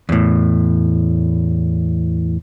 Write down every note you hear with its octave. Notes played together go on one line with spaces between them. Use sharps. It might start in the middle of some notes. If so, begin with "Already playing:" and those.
E2 A2